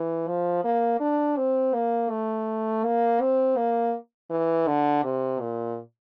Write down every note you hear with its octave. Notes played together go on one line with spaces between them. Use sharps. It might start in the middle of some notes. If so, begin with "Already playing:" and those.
Already playing: E3
F3
A#3
D4
C4
A#3
A3
A#3
C4
A#3
E3
D3
C3
A#2